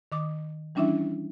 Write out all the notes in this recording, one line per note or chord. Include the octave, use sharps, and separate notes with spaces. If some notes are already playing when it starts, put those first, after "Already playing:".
D#3 D6 D#6
E3 G3 C#4 D4 E4 E5